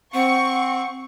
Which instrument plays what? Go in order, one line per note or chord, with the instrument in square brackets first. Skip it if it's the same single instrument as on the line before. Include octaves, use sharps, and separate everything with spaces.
[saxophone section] C4 [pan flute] F#5 [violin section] C#6